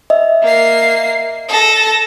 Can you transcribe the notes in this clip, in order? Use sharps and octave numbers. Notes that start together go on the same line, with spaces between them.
D#5 E5
A#3 C7
A4 A#6